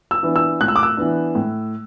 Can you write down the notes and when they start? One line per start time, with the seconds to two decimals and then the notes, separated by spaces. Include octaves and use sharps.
0.11 E6
0.23 E3 B3 D4
0.36 E6
0.61 A2 F#6
0.68 E6
0.76 D6
0.83 E6
0.97 E3 B3 D4
1.35 A2